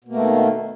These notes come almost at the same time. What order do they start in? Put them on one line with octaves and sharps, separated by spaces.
B2 A#3 A3 D#3